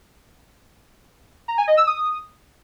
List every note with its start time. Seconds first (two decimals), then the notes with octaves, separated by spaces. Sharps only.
1.48 A#5
1.58 G#5
1.68 D#5
1.77 E6
1.87 D#6